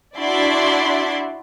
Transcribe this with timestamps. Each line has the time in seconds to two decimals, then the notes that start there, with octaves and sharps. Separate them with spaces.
0.18 D4 E4 F#4 D5 E5 C6